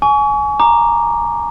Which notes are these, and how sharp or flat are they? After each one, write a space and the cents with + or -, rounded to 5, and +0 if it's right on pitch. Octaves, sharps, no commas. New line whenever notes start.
G#5 +20 C#6 +35
A#5 +0 D6 +15